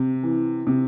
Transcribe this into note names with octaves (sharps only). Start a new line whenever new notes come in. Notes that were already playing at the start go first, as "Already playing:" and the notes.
Already playing: C3
E3
C3